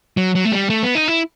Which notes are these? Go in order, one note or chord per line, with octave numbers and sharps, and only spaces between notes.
F#3
F#3
A3
G3
A3
B3
D#4
E4